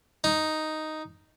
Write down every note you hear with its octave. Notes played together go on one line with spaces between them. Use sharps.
D#4